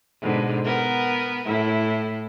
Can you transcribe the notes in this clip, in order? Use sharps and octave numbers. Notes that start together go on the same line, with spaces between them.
G#2 B2 D3
B3 A#4
A2 E4